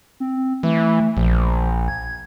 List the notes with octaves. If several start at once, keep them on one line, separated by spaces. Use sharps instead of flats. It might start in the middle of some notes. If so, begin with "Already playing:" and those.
C4
E3 A3
A#1 F3
G#6